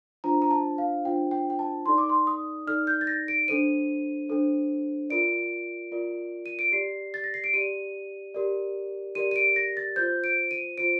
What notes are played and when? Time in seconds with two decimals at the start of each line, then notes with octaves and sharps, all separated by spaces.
0.24 D4 F4 C5 A#5
0.42 A#5
0.51 A5
0.78 F5
1.05 D4 F4 C5 G5
1.31 G5
1.50 G5
1.59 A5
1.86 D#4 A4 D5 C6
1.98 D6
2.09 C6
2.27 D#6
2.67 D#4 A4 D5 F6
2.87 G6
3.01 A6
3.07 A#6
3.28 D7
3.48 D4 A4 C5 D#7
4.29 D4 A4 C5
5.10 F4 A#4 D5 D7
5.92 F4 A#4 D5
6.46 D#7
6.59 D7
6.72 G4 D5 C7
7.14 A6
7.24 A#6
7.34 C7
7.44 D7
7.53 G4 D5 D#7
8.34 G4 A#4 D5
9.15 G4 A#4 D5 D#7
9.31 D#7
9.36 D7
9.56 A#6
9.77 A6
9.96 F4 C5 G6
10.24 D7
10.51 D#7
10.78 F4 C5 D7